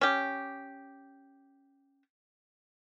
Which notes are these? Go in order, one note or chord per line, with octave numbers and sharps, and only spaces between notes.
C#4 G4